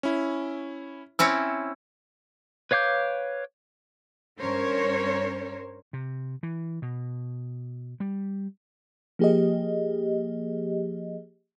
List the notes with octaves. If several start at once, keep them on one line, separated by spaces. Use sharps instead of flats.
C#4 E4
C4 C#4 E4 E6 C#7
B4 C#5 F5 D6 G6
G2 C#4 A#4 C5 C#5
C3
E3
B2
G3
F3 A#3 G4 G#4 D#5